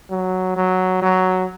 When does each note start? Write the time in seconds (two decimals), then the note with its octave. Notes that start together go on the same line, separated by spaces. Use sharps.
0.10 F#3
0.56 F#3
1.02 F#3